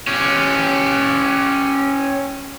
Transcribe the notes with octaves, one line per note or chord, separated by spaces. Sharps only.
C#4 G4